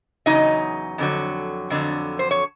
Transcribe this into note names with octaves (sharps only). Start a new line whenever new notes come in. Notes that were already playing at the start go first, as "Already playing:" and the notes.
E2 C#3 F#3 D#4 D#5
F2 D3 F#3
F2 D3 F#3
C5
C#5